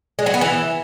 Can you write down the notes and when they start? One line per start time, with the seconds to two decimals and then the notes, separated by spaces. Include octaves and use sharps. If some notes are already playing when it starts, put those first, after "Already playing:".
0.19 G#3
0.26 F#3
0.34 B3
0.41 E3